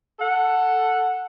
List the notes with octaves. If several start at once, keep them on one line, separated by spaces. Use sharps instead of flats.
A4 F#5